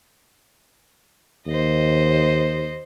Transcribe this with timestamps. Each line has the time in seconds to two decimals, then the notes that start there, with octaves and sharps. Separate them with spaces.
1.47 D#2 C5 D#5